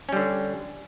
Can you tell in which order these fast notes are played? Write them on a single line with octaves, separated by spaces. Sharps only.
C#4 G3 D3